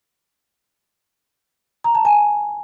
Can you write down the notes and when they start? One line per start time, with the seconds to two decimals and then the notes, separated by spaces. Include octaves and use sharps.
1.84 A#5
1.95 A5
2.05 G#5